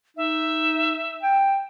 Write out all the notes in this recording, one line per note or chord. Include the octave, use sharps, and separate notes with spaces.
D#4 E5
G5